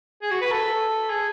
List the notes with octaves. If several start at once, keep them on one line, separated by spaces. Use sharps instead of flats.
G#4
F#4
B4
A4
G#4